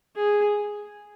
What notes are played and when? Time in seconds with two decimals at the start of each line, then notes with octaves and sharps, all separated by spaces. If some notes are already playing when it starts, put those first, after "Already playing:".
0.16 G#4